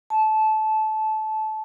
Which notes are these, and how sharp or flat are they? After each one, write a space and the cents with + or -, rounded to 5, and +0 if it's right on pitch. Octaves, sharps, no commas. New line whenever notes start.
A5 -20